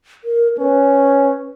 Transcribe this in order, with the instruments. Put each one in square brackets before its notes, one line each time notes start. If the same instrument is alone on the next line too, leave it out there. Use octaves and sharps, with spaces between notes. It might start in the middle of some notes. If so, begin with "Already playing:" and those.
[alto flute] A#4
[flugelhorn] C#4 [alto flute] B4